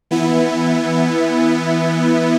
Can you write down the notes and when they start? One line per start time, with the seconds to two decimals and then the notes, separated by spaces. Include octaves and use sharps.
0.11 E3 B3 E4